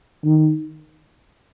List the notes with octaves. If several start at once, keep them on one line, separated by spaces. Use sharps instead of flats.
D#3